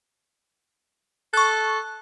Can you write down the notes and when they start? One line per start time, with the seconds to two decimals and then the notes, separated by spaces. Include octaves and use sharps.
1.34 A4 C#6 F#6